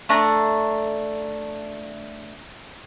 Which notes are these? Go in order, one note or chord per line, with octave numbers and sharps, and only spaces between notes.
A3 D4 A#5